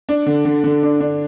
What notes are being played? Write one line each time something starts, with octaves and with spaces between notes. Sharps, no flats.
D4
D3
D3
D3
D4
D4